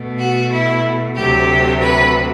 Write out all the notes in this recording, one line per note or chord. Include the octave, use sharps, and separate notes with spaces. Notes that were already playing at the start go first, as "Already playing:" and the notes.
Already playing: B2 A3
F#4
E4
D2 C3 F#3 A3 G4
B4